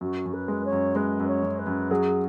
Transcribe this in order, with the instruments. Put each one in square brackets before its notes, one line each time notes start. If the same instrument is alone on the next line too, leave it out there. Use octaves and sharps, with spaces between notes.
[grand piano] F#2 [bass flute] F#4
[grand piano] F#2
[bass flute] B4
[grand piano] G#3
[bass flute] C#5
[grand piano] F#2
[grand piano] G#3 [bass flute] B4
[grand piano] F#2
[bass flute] C#5
[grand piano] F#2
[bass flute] B4
[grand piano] F#2
[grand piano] F#3 [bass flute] G#4